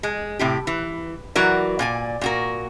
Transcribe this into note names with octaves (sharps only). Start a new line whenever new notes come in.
G#3
A2 C3 G4
E3
E3 F#3 F#4 A#4 D5
A#2 D5 G#5
A#2 F#4 A#4